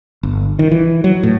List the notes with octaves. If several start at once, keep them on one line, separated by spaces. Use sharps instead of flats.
G1
D#3
E3
F#3
A2